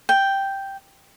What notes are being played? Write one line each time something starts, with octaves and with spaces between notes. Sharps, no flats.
G5